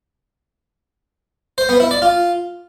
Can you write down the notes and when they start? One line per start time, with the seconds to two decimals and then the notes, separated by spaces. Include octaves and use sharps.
1.58 C5
1.69 B3
1.80 E4
1.91 D5
2.02 F4